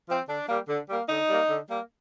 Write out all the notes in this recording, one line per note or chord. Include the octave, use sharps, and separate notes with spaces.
F3 C4
D3 D4
G3 A#3
D3
G3 A#3
D3 D#4
G3 A#3
D3
G3 A#3